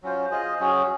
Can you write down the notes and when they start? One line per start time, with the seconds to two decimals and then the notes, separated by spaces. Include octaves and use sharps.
0.03 F#3 C#4 F4 C5
0.31 F4 G#4 C5 D#5
0.60 F#3 C#4 G#4